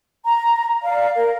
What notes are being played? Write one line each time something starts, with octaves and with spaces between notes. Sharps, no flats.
A#5
D5 F5
A#4